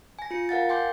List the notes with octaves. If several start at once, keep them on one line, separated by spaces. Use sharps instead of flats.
G#5 A#6
F4 C#7
A#4 F5 F#5 A6
G5 G#5 C6 D6 G6